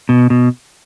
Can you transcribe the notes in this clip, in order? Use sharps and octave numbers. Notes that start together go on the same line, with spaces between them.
B2
B2